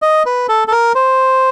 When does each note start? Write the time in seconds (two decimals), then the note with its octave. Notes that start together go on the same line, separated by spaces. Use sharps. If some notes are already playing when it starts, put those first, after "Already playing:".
0.02 D#5
0.26 B4
0.49 A4
0.68 A4
0.72 A#4
0.95 C5